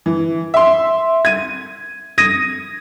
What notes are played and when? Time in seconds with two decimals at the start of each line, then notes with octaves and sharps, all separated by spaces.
0.06 E3
0.54 E5 C6
1.25 G#6 D#7
2.18 D#6 G#6 A#6 D#7